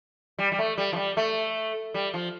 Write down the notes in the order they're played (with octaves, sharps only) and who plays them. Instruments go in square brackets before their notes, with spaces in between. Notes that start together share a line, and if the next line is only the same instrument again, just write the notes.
[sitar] G3
G3
A3
G3
F3
G3
A3
G3
F3